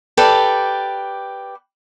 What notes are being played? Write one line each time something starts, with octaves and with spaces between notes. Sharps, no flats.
G4 A4 B4 D5